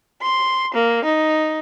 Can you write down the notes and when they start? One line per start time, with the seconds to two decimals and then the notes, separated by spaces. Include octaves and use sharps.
0.22 C6
0.75 A#3
1.06 D#4